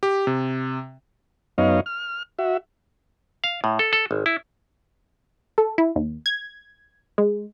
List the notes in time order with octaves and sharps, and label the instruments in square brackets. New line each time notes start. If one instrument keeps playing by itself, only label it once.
[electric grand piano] G4
C3
[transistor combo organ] F#2 B3 D#4 C#5 D#5 F5
F6
F#4 E5
[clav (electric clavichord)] F5
A2
A4
A4
G#1
E4
[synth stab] A4
E4
D#2
G#6
G#3